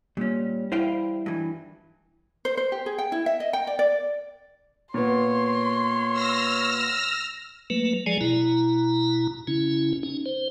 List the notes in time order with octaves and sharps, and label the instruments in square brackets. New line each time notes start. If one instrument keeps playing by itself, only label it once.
[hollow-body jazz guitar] A#2 C#4 [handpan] G3
[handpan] E4 [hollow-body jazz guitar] C5 F5 G5
[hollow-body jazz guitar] G2 E3
[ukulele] C5
C5
G4
G#4
G5
E4
E5
D#5
G5
D5
D5
[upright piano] A#2 B3 [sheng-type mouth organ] C#5 [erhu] C6
[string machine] E6 F6 A#6
[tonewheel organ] F#3 A3 A#3 B4
F3 F#3 G#3 G#4 D5 G#5
B2 E4 A#5
C#3 C#4 E4
C#4 D#4
C5